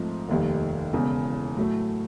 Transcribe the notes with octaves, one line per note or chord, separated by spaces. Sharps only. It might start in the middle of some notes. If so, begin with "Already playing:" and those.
Already playing: G#2 F3 A3 C4
F1 D#2 D#3 G3
E1 E2 C#3
A2 F#3 A3